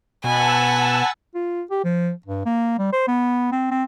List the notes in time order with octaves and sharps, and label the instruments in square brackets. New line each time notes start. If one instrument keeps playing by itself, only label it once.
[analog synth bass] B2 [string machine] F#5 A5 E6 [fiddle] G#5 B5
[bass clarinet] F4
G4
F3
G2
A#3
G3
C5
B3
C4
C4